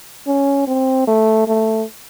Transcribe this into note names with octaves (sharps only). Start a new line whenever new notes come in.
C#4
C4
A3
A3